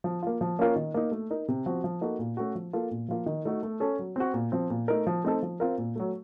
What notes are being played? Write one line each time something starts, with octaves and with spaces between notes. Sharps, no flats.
F3
A#3 F4
F3
A#3 C#4 F4 A#4
D#3
A#3 D#4
A3
D#4 A#4
C3
F3 C4 F#4
F3
A#3 D#4 F#4 A4
A#2
A3 C#4 F#4
F3
A#3 F4 A4
A#2
F3 A#3 F4 A#4
D#3
A3 D#4 F#4
A3
C#4 A4
F#3
C4 F#4
A#2
F3 C4
A#2
A3 D#4 A#4
F3
A3 C4 D#4 A4
F3
C4 F4 A#4
A#2
F#3 A3